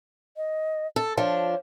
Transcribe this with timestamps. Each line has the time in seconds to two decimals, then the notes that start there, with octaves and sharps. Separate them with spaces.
0.37 D#5
0.96 A4
1.17 F3 D4 C#5